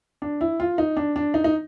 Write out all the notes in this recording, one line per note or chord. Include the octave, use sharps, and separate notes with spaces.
D4
E4
F4
D#4
D4
D4
D#4
D#4